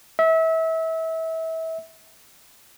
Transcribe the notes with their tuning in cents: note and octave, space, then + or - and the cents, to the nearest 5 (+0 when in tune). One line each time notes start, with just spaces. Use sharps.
E5 -30